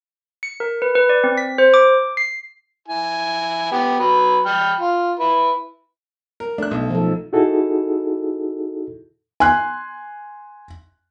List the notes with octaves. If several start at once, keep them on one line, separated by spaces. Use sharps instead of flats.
C#7
A#4
B4
B4
D5
C4
B6
C5
D6
C7
E4 G#5
B3 G4
F#3 B4
G5 B5 F6
F4
E4 B4
A#4
A3 D4 F#6
B1
F3 D#4 A4
D#4 E4 F#4 G#4 A4
G#5 C6 F#6